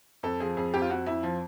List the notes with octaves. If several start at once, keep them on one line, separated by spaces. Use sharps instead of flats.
F2 A4
F3 G#4
F2 G#4
F2 G4
F4
F2 F#4
F2 E4
F3